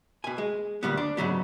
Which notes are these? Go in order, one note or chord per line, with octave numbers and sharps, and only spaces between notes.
B2 G#5
G#3
D2 A#2 G3 B3
D4
G#2 C#3 F#3 B3